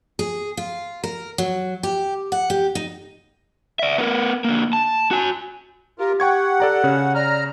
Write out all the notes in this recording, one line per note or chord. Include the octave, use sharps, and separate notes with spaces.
G#4
F4
A#4
F#3
G4
F#5
G4
D#4
D5 E5
B3 A#4
D3 A#3
A5
F#4 G#5
F4 G4 A#4
F#5 G5 C#6 G#6
A4 D5 A#5
C#3 C#4 C#5
D5 A#5 F6